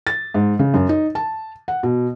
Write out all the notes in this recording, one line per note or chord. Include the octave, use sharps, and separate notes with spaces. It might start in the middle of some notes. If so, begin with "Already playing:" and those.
A6
G#2
C#3
F#2
D#4
A5
F#5
B2